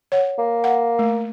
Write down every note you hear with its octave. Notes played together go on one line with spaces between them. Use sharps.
C#5 F#5
A#3
F#5
A3